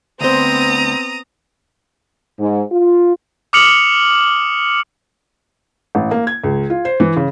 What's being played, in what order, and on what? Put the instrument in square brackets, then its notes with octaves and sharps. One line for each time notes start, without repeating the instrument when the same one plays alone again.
[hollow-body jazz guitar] D2 C5 [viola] B3 C4 [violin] A#5 D#6
[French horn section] G#2
F4
[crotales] D6 D#6 F6 C#7 F7 F#7
[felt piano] A1
A#3
G#6
C#2
F4
C5
E3
C#3